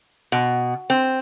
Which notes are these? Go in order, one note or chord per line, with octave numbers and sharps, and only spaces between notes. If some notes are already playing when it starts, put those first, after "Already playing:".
B2
C4